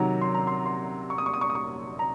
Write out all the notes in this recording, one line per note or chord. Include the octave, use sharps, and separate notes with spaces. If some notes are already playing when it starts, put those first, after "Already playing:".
Already playing: C3 D#3 F#3 A#5
C6
A#5
C6
C6
C#6
D#6
C#6
D#6
C#6
D#6
C#6
A#5